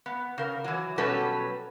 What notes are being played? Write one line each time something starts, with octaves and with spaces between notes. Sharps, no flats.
B3
C#3 A#4
E3 F#3
B2 F#3 G3 C#4 A4 B4